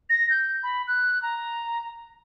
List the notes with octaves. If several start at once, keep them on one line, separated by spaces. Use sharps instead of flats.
A#6
G6
B5
F#6
A#5